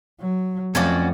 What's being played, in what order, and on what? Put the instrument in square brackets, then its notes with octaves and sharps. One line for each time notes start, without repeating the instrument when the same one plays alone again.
[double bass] F#3
[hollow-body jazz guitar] F2 [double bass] F3 A3 [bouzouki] C#4 F#4 D5